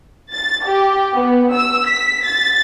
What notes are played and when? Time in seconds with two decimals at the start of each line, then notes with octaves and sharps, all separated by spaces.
0.32 A6
0.66 G4
1.14 B3
1.53 E6
1.87 B6
2.24 A6